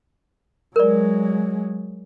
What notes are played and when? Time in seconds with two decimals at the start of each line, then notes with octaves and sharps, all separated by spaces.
0.76 F#3 G#3 A#4 D5